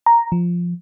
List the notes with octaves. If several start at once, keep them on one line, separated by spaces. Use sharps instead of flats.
A#5
F3